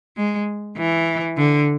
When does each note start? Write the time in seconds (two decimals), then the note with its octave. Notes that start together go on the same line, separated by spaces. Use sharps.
0.17 G#3
0.77 E3
1.37 D3